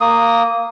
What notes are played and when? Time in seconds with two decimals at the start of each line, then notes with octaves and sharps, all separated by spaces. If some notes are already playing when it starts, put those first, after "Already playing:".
0.01 A#3 D#6